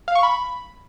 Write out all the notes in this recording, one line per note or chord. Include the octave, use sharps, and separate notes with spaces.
F5
C#6
B5